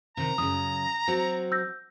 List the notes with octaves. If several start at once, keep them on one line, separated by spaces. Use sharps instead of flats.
C3 D#3 A#5
F#2 C#3 D#6
F#3 C4 F#4
E6 G6 A#6